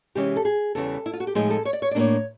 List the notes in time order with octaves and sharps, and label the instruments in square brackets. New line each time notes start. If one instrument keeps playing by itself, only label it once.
[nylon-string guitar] C3 E3 G#3 C#4 G4
A4
G#4
E2 C#3 E3 G3 A4
E4
F4
F#4
G4
A2 F3 G#3 C4 D#4 G#4
A4
C#5
D5
C#5
D5
A2 F#3 A#3 D4 C#5